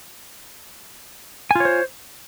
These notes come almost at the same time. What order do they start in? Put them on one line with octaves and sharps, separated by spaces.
G#5 F4 C#5 C5